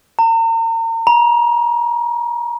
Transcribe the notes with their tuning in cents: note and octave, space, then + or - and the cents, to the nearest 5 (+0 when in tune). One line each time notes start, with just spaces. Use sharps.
A#5 -40
A#5 +35